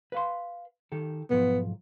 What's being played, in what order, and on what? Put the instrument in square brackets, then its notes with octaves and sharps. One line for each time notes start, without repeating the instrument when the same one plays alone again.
[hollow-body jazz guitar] B4 F5 C6
D#3 G4 A4
[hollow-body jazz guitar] B1 G#2 F3 [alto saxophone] B3